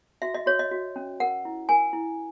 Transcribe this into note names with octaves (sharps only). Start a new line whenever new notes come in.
F#4 E5
D#5
F#4 C#5
D#5
F#4
C#4
A#4 F#5
E4
A#4 G#5
E4